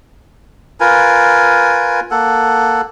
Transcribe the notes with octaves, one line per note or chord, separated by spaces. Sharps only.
F4 A#4 B4 G#5
A#3 A4 F#5